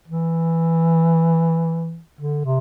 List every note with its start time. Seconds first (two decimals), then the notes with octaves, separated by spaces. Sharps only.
0.08 E3
2.21 D3
2.45 C3